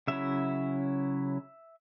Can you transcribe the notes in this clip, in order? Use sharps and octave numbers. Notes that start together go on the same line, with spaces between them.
C#3 F#3 C#4 E4 E5